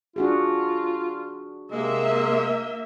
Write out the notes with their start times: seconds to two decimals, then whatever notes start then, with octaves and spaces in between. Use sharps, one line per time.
0.16 D4 F4 F#4 G#4
1.71 C3 G#3 A#3 E5